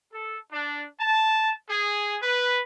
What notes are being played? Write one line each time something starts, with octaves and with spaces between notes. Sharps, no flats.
A4
D4
A5
G#4
B4